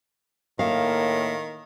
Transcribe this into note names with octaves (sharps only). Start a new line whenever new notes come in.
A2 D#3 A#3 F5